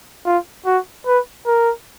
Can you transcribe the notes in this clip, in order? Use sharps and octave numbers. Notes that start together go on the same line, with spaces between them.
F4
F#4
B4
A#4